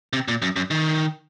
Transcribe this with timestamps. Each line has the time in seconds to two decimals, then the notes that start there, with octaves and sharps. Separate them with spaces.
0.13 C3
0.28 A#2
0.42 F#2
0.56 F#2
0.71 D#3